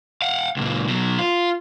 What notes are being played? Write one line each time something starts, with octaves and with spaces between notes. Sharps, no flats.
F5 F#5
C#2 A#2
B2 F#3
F4